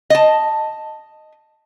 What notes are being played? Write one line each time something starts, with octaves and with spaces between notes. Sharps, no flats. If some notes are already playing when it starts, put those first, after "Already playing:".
D#5 A5